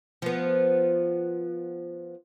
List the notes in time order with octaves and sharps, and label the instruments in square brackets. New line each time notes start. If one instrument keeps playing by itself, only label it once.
[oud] F3 B3